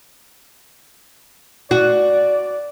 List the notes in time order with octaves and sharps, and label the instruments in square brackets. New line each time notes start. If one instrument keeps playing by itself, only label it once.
[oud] F#4 [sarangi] D5